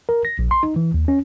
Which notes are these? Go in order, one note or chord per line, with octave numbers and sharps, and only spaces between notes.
A#4
A#6
A#1
C6
D#4
E3
D#2
C#4